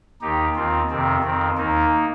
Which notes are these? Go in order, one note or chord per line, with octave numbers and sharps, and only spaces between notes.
D#2 D#3 D#4 G4
D#2 D#3 C4 F4
F2 C3 D#3 C4
F2 D#3 C4
D#2 D#3 A#3 D#4